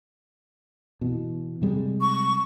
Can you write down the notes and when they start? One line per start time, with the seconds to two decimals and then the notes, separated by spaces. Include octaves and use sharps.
1.01 B2 E3
1.62 C3 G3 G#3
2.01 C#6